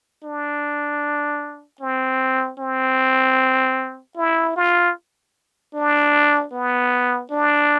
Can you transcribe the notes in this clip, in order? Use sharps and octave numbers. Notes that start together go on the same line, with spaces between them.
D4
C4
C4
E4
F4
D4
B3
D4